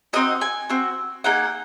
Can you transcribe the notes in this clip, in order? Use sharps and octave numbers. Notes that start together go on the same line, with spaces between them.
C4 D#4 F#4 D#5
G#5
C4 F#4
A#3 D#4 G#4 F#5